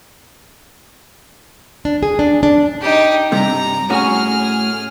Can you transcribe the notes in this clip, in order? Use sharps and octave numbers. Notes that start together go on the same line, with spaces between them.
D4
G#4
D4
D4
D#4 G4
G2 C3 A#5
A2 C#4 F#4 G#4 F6